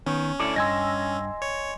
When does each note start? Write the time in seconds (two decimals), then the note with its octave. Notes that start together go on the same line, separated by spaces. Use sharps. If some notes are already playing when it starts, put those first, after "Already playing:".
0.06 D#3 B3 C#4
0.40 D2 E4 A4 D5
0.56 G2 D#5 G#5 C6 E6 G#6 A#6
1.42 C#5